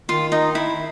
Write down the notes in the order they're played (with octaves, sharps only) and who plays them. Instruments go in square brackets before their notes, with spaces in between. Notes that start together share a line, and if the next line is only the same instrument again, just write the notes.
[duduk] D#3 [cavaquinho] F4
[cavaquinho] D#4
E4